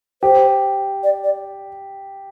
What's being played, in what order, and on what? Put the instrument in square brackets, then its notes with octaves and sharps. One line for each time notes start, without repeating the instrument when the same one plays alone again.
[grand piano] G4 [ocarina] C5
[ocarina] D5
D5